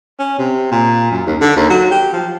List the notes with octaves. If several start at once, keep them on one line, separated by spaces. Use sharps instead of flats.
C#4
C3
A#2
F#2
D#2
D3
D#2
F#3
G4
F3